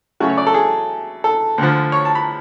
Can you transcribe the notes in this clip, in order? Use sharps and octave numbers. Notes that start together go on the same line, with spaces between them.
C#3 F#3 A3 C#4 F#4
C#5
D5
A4
G#4
A4
D2 D3 F3
C#5
A5
B5